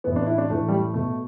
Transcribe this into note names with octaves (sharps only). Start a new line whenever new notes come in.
A2 E3 B3
D4
E4
D4
A2 E3 A3
G3
A3
B2 A3